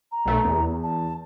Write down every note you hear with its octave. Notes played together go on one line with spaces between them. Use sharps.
A#5
B1 A3
E2
A5